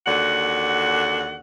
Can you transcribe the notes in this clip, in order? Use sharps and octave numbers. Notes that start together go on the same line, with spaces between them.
D#2 D3 F#4 F#5